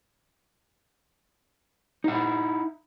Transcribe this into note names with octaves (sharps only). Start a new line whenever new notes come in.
D#4 E4 F#5